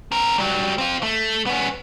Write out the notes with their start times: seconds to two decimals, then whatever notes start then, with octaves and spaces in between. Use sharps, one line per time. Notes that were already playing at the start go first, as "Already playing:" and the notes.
0.12 C4 A#4
0.38 F#3 G3
0.78 C4 F4
1.03 A3
1.46 B3 C#4